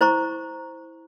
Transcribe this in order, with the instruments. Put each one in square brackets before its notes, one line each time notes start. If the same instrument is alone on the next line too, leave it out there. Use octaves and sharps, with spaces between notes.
[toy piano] E4 C5 A#5 C#6